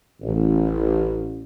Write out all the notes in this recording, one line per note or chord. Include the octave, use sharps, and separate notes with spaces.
A1